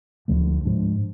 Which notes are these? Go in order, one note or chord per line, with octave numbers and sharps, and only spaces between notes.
D2 D3 F3 A3
G#2 F3 G#3 D4